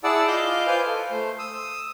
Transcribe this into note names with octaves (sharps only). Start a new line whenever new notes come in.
E4 G#4 D5 F#5 A5 E6
F4 D#5 F5 D6 G6
F4 B4 C5 G#5 F6 G6
A4
A3 C5
D#6 E6